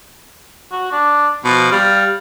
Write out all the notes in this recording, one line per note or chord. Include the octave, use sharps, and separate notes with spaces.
F#4
D4
B2 F3
G3 F5